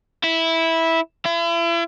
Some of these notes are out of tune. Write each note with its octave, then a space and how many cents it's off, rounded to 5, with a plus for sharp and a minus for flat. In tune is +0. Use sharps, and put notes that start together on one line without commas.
E4 -10
E4 +40